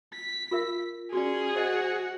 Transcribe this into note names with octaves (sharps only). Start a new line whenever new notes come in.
B6
F4 A#4 E5
C#4 F#4 G#4 D5
F#4 C5 D#5